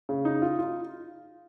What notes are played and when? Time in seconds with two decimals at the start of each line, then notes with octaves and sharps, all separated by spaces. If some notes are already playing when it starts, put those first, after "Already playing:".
0.09 C#3
0.25 D#4
0.42 F4
0.59 F4